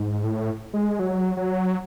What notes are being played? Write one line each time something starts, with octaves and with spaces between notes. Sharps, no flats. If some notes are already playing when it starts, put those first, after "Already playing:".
Already playing: G#2
A2
G#3
F#3
F#3